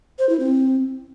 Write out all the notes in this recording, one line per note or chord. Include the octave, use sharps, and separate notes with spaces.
C5
E4
C4